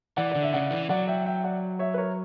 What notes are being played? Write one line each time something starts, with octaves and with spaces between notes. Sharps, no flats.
E3 D5 F#5
D3 D5
E5
C#3 D5 F#5
E3
F#3 D5 F#5
E5 G5
E5 G5
D5 F#5
C#5 E5
B4
A#4 C#5